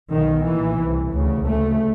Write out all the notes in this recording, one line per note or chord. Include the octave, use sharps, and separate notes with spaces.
B1 B2 D#3
B1 A#2 E3
C2 C3
D2 C#3
D2 C#3 A3